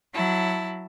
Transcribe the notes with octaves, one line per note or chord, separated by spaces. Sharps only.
F#3 E4 A5